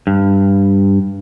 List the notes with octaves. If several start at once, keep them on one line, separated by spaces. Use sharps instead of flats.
G2